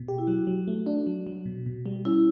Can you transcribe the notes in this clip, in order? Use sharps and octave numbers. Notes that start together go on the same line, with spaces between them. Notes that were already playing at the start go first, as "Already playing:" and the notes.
Already playing: B2
G4
E4
F#3 F#4
F#3
A3
D4
F#3
F#3
B2
B2
G3
C#4 E4